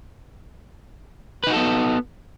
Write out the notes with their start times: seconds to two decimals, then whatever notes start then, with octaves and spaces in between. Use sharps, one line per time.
1.44 B4
1.47 D#4
1.50 F#4
1.53 A4
1.57 B3